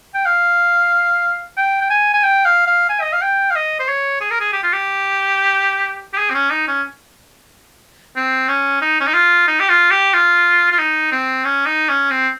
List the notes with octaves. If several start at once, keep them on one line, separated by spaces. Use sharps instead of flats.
G5
F5
G5
G5
G#5
G#5
G5
F5
F5
G#5
D#5
F5
G5
F5
D#5
C5
C#5
G#4
A#4
G#4
G4
F4
G4
G4
G#4
C4
C#4
D#4
C#4
C4
C#4
D#4
C#4
D#4
F4
D#4
G4
F4
G4
F4
F4
D#4
C4
C#4
D#4
C#4
C4